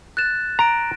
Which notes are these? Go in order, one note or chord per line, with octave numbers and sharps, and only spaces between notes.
F#6 A6 E7
A#5 C6 A#6 D7